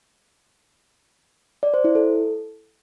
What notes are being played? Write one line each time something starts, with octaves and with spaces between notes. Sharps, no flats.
D5
C5
E4
A4